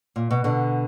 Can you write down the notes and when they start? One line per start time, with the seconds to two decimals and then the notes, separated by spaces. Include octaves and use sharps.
0.16 A#2
0.31 B2
0.44 B2 D3